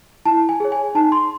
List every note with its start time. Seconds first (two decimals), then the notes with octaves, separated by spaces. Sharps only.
0.25 E4 A5
0.49 G#5
0.60 G#4 C#5
0.72 G#5
0.95 D#4 A5
1.12 C6